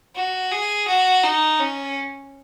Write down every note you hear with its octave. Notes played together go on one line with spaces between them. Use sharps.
F#4
G#4
F#4
D#4
C#4